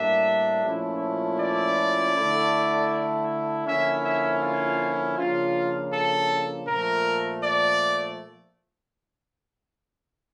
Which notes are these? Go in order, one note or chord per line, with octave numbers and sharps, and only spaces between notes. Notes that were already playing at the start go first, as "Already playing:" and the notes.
Already playing: A2 G3 A#3 D4 E5
A#2 F3 A3 C#4 E4
D5
D3 A3 E4
D3 F3 A#3 C#4 E4 E5
E5
F4
C#3 F3 A#3 D4 F4
A4
A#2 F3 A3 A#4
D5